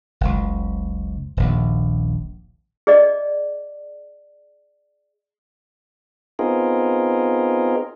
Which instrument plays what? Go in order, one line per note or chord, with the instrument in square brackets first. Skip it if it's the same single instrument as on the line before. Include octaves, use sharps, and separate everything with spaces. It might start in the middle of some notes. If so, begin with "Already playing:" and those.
[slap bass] F#1 C#2
D#1 A#1
[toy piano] G#4 D5 D#5
[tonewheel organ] B3 C4 D#4 F4 G#4 A#4